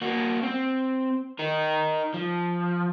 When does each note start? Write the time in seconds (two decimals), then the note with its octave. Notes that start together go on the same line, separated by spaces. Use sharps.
0.02 A#3 F#4
0.43 C4
1.39 D#4 A#4
2.14 F3